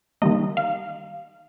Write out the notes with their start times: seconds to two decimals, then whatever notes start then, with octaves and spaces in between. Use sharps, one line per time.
0.22 D#3 G3 A#3 D#5
0.57 F5